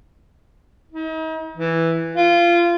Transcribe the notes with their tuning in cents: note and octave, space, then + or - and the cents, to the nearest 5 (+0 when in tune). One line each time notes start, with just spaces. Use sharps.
D#4 +40
E3 +0
F4 -20